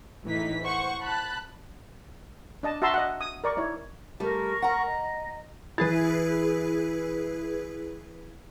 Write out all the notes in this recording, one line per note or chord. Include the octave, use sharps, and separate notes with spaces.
A2 E3 D#4 B6
C5 F#5 C#6
A5 B5 F#6
D4 D#5 A5
F#4 E5 A5 A#5 C6 E6
D#5 F#5
D#6
A#4 D5 C#6
D#4 E4 C#5
G3 A3 A#4 C#6
F#5 A#5
D#5
E3 E4 G#4 B4 A6